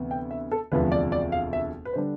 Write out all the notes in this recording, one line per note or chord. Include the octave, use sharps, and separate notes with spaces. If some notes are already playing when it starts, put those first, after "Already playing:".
Already playing: D2 C3 E3 B3
G5
E5
A4
E1 D2 C3 F3 B4
D5
D5
F5
E5
B4
C5
D3 G3 D4